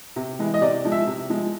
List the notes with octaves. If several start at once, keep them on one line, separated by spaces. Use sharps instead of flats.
C3
E3 G#3
D#5
C3 D5
F3 G#3
E5
C3
F3 G#3